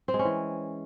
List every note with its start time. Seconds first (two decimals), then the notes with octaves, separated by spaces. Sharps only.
0.08 C4
0.14 G#3
0.19 C#4
0.25 E3